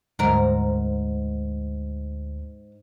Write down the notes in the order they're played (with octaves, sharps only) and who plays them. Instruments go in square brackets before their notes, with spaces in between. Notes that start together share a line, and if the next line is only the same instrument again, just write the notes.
[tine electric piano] D2 [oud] G#2 A#4